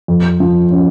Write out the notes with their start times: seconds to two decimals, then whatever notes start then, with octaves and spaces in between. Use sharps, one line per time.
0.08 F2
0.40 F3
0.71 C#4